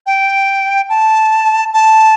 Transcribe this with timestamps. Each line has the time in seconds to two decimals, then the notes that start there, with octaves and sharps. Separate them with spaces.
0.06 G5
0.89 A5
1.73 A5